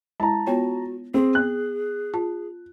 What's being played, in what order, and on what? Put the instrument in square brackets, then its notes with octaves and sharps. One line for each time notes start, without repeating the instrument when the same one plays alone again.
[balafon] G#3 E4 [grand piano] A5 A#5
[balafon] B3 F4 C#5 [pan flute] F#4
[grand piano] C4 [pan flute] G#4
[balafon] B3 [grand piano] F#6
[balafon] F4 A5